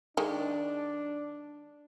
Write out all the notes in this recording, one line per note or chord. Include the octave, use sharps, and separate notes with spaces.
D#3 G#3 D4